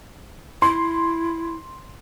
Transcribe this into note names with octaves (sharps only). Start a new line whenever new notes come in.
E4 C6